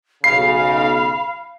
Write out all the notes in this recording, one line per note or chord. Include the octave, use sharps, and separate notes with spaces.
B1 C#3 F5 B5 C7